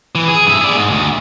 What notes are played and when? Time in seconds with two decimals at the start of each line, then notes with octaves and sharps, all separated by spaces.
0.15 E3
0.28 G#4
0.47 G2 E5
0.61 G#4 D5
0.76 G#2
0.90 D2